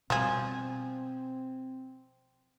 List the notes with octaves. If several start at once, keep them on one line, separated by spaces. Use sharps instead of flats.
B2 F3 G3 C4 G#4